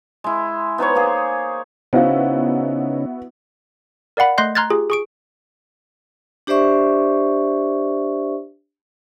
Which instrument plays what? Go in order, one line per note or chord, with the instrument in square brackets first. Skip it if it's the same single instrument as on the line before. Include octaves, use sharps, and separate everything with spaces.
[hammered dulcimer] G#3 E4
B3 D#4 C5 C#5
A#3 G#4
[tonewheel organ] C#3 C#4 D#4 [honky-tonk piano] B3 E4 F#4 [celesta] C5 F5
[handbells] A#4 D5 F5 F#5 B5
A3 D#5 C6 F#6 G6 C7
A#5 C6 F6 F#6 G#6 A6
F4 G4 G#4
G#4 C#6 D7
[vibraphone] D4 G4 C5 D5 E5 C#6